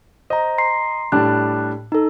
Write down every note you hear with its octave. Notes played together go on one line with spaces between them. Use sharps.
C5 D#5 A#5
A#5 C6 C7
A2 G3 D4 A5 F#6
D#4 A4